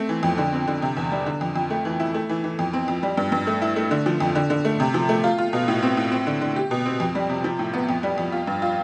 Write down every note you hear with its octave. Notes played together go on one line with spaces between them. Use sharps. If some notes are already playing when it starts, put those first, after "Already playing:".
Already playing: A3 C4
E3
F2
D3
C4
D3
C3
E2
G3
D3
F2
F2
A3
E3
E4
A3
E3
E3
F2
C4
F2
G3
G2
G2
A3
E4
A3
D3
F3
F2
D3
D3
A3
C3
F3
A3
F4
F4
B2
A2
C4
A2
C4
D3
D3
G4
B2
C4
F2
G3
C3
F3
A2
B3
F2
G3
F2
F4
G2
F4